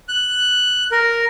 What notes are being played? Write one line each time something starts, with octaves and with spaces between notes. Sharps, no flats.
F#6
A#4